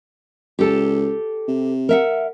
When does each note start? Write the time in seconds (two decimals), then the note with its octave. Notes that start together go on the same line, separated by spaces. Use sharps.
0.59 C#2 G4 A4 A5
1.48 C3
1.89 A#4 E5 F#5